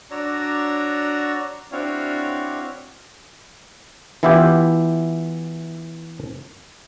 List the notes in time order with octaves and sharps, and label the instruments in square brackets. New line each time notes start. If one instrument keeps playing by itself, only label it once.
[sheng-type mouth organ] D4 F#4 C#5 D5 A#5 E6
C4 D4 E4 F#4 C#5 F5
[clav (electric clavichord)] E3 B3 E4 F4 G4